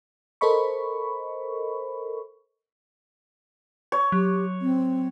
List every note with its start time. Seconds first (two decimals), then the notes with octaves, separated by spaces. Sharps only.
0.41 A4 A#4 C5 D#5 B5 C#6
3.92 C#5
4.12 F#3 G4
4.61 C4